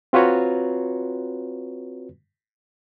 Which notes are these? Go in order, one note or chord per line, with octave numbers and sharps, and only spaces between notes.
C4 F4 F#4 B4 C#5 A#5